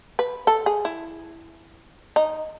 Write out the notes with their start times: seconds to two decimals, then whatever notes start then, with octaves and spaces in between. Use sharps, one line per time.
0.19 B4
0.47 A4
0.66 G#4
0.85 E4
2.16 D#4